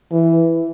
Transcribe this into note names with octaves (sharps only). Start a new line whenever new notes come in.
E3